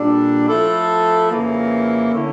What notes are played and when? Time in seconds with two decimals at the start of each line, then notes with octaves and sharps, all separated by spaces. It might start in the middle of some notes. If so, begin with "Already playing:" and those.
Already playing: A#2 G3 D4 A4
0.48 F3 A3 E4 A4
1.31 F2 C#3 E3 A#3
2.13 D3 A3 C#4 E4